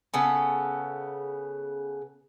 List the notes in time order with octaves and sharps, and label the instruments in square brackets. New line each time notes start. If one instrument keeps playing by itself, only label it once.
[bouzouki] C#3 B3 A4